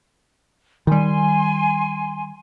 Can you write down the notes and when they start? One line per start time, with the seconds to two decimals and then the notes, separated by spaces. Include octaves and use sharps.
0.87 D#3 G3 G#5 C6